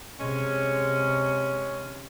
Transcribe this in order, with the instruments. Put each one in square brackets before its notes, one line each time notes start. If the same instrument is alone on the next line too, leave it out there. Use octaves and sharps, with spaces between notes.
[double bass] C3 [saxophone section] G#3 C#4